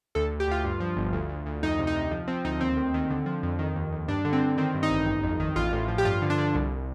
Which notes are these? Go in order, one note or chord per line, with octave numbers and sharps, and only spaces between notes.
D2 A4
D2
G4
D2 F4
G2
F3
G1
D2
D2
D2
F2 D#4
C3
D#4
C3
F3
F3 C4
D2 D#4
D#2 C4
D#3
D#3
D3
F3
F2
D#3
D#2
D#2
G2 D4
D3
C4
D3
D#3 C4
G2
D#4
A1
G1
F2
D#3
A1 F4
A2
F3
G4
G2 F4
D3
D4
D3
C2